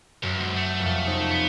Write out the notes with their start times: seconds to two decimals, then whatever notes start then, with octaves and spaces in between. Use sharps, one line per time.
0.23 C#2 F#2
0.40 D2 G#2
0.56 A3
0.80 C2 F2
1.07 C#4 D#4 C5
1.31 B3